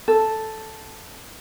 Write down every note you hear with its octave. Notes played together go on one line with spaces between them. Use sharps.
A4